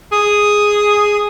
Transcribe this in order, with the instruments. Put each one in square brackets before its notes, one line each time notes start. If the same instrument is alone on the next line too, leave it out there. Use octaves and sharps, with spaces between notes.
[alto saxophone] G#4 [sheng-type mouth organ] D#6